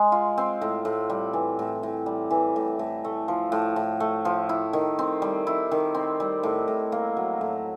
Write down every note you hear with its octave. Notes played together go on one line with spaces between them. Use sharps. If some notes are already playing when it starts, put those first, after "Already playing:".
Already playing: G#3
F4
C4
A2
A2
G3
E3
A2
A2
G3
E3
A2
A2
A3
F3
A2
A2
A3
F3
E4
D#3
C4
G3
E4
D#3
C4
G3
A2
A2
A#3
F#3
A2